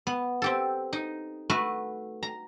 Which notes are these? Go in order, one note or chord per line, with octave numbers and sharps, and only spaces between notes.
B3
C4 G4 A4
D#4
A3 F#4 B4
A#5